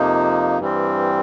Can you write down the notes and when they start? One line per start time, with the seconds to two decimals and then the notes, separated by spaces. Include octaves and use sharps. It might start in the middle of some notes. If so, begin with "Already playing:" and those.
Already playing: F2 C3 F3 A#3 D#4
0.59 G2 E3 G3 C4